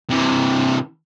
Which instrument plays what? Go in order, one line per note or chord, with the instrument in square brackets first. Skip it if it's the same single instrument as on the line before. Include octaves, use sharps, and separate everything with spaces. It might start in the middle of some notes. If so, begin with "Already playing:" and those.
[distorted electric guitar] C3 E3